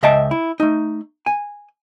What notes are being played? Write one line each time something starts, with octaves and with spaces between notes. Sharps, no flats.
C#2 D#5 E5 G5 A5
E4
A3 D#4
G#5